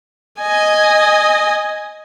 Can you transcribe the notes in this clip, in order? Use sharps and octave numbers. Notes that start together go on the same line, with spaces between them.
D#5 G#5